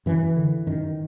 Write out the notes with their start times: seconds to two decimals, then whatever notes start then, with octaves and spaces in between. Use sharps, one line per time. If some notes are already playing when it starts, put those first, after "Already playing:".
0.06 F#2 E3
0.36 D3
0.67 F#2 D#3